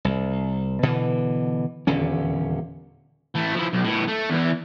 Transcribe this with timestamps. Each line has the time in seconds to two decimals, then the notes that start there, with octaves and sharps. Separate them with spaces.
0.05 C2
0.83 B2 D3 E3
1.87 D#1 E2 D3 C#4
3.35 E3 A3
3.55 F3 E4
3.73 B1
3.84 A2 B3
4.07 A3
4.29 E2 E3